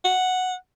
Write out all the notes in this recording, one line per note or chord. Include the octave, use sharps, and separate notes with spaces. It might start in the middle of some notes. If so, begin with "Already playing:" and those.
F#5